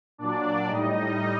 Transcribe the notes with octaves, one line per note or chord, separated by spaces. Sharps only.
A#2 F#3 D4 D5
A2 G3 D#4 D#5